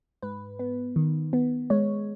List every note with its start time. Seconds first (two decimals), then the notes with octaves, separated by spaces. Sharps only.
0.22 G#2 B4
0.59 B3
0.96 D#3
1.33 B3
1.70 G#3 C#5